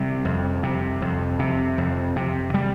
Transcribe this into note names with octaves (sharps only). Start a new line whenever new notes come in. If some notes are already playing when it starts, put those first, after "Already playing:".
Already playing: C3 G3
F2
C3
F2
C3
F2
C3
G3